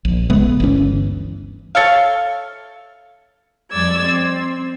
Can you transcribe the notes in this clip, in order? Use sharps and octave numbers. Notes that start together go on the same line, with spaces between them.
A#1
C#3 G#3 A3 B3
G1 D2 E3 C#4
A4 C#5 E5 F5
F2 G3 D5 E6 G#6
C4